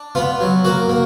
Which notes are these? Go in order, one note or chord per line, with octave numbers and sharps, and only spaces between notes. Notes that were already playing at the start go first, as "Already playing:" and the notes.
Already playing: D4
B3 F4
F#3
A#3 F#4
A#3